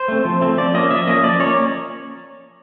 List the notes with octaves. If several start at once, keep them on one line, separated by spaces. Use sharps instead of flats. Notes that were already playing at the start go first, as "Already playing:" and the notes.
Already playing: C5
A3 C4
F3
A3 C4
F3 D5
A#3 C#4 D#5
F3 E5
A#3 C#4 D#5
F3 D5
A#3 C#4 C#5